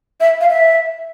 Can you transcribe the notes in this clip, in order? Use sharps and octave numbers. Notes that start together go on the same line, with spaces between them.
E5
F5
E5